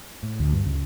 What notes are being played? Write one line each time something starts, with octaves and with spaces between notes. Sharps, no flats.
A2
D2
G2
C#2